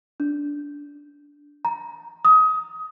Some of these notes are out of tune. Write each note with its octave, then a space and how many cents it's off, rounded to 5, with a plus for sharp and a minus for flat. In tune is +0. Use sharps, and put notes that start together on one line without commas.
D4 -15
A#5 +5
D#6 +25